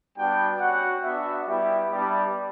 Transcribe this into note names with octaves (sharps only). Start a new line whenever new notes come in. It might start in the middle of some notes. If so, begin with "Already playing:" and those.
G3 B3 D4 F#4 G5
C#4 F#4 F#5
B3 D4 F#4 E5
G3 B3 E4 G4 E5
G3 B3 D4 G4 D5